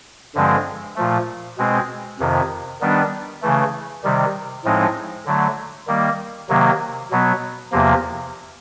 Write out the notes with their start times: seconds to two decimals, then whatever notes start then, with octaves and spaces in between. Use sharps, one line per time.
0.35 G2 D3 F3 G#3 C4
0.96 A#2 F3 A3
1.58 B2 G#3 C4
2.19 F2 C3 D#3
2.81 D#3 G3 B3 D4
3.42 C#3 E3 A3
4.04 C3 D#3 G3
4.65 A2 F3 G#3 C4 D#4
5.26 D3 F#3 A3
5.87 D#3 G3 A#3
6.49 C3 D#3 F#3 A#3
7.11 B2 F#3 B3
7.72 E2 C3 F3 A#3